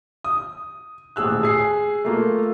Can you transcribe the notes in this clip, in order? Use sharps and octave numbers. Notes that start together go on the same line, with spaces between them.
D#6
D#1 A1 G#4 E6 F#6
G#4 C7
A3 A#3 F4